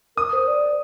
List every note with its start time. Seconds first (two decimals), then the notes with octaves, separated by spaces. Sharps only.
0.17 A#4 D#6
0.33 C5
0.47 D5